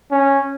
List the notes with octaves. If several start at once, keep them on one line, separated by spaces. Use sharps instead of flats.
C#4